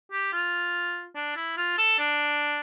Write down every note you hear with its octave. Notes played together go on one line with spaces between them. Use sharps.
G4
F4
D4
E4
F4
A4
D4